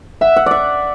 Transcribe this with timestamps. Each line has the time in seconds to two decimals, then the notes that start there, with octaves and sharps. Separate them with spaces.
0.21 E5 F#5
0.37 F#5
0.46 D5 E5